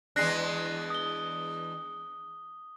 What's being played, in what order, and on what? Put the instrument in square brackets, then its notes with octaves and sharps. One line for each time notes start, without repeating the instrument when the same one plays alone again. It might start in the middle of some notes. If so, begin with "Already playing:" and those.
[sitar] E2 G#3 D4 [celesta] F#6 A#6 C7
[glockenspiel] D#6 G7